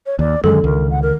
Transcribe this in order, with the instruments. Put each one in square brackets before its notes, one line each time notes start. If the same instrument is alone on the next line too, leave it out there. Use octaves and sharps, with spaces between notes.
[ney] C#5
[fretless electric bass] D#2 [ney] D5
[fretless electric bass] F#2 [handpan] D3 D#3 [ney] G#3 [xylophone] A4
[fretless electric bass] C#2 [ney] A#4
[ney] F#5
A#4